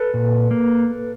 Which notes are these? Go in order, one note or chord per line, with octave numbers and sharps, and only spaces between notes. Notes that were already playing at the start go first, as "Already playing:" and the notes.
Already playing: A4 B4
A#2
A#3